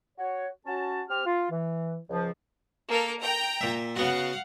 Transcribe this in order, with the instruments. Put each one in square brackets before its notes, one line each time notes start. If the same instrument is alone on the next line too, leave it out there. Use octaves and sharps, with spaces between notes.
[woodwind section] F#4 C#5
C#4 F#4 A5
C4 G4 F6
F4
E3
C#2 F3
[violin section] A#3 A4 A#4
G5 A#5
[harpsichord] A#2 E5
[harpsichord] C#3 B3 F#4 [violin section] F5 F#5